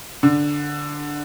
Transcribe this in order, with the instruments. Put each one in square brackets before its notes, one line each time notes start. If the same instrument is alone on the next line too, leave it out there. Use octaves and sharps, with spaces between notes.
[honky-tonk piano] D3